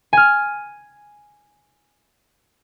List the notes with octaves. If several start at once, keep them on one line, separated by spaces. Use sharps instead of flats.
G#5 F6